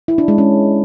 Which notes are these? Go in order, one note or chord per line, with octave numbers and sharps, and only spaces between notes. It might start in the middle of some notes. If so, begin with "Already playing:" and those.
E4
D4
G#3
C#4